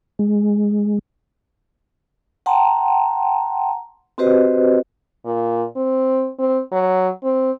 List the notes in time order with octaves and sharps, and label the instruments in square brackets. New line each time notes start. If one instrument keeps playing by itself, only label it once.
[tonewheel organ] G#3
[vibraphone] F#5 G5 A5 A#5 C6
C4 F#4 G4 B4 C5 D#5
[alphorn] A#2
C4
C4
F#3
C4